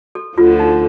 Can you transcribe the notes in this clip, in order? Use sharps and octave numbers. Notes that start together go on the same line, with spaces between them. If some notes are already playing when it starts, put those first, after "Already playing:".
A4
D2 D3 F3 F4
D#4